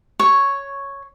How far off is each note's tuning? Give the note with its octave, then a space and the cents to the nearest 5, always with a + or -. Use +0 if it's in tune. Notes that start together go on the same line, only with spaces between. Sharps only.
C#5 +0 C#6 +0